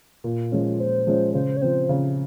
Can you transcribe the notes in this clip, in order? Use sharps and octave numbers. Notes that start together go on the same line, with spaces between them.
A#2
F3 G#3 C#4
A#2 C5
F3 G#3 C#4
C#3 C5
C#5
F3 C4 C5
C#3